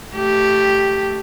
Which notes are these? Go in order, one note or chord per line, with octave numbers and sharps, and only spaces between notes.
A3 G4